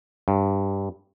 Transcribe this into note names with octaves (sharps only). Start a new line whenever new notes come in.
G2